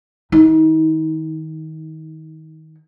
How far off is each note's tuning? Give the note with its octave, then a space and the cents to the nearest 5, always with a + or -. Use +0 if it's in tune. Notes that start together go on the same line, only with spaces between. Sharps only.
D#3 +15 D#4 +35